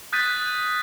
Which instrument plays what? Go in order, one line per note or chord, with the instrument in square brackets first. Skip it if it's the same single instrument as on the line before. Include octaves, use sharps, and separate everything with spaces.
[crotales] D#6 F#6 G6 A6 B6 D#7